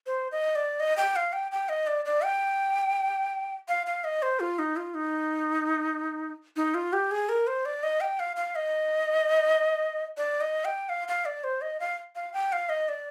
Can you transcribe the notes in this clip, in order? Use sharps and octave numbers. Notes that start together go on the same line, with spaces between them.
C5
D#5
D5
D#5
G5
F5
G5
G5
D#5
D5
D5
G5
F5
F5
D#5
C5
F4
D#4
F4
D#4
D#4
F4
G4
G#4
A#4
C5
D5
D#5
G5
F5
F5
D#5
D5
D#5
G5
F5
F5
D5
C5
D#5
F5
F5
G5
F5
D#5
D5